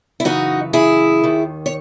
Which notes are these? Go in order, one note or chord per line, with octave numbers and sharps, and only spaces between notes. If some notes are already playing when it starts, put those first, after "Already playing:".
E4
F#2 C#3 E3 D#4 F#4
E4 G#4
D#2 D#3
C#5